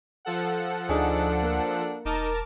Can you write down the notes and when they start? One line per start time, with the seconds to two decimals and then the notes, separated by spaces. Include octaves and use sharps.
0.25 F3 A4 F#5
0.89 D2 D4 D#4 G#4
1.43 A#3
2.05 E1 D#4 A#4 A5 D6